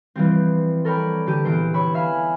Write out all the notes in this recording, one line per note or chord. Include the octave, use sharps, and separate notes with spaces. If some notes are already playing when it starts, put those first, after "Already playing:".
E3 F3 G3 C4
A4 A#4 C#5 D5 G5 B5
D3 G4 D#7
A#1 E3 B3 D4 C5 D7
C#5 B5 E6
E5 F5 G#5 B5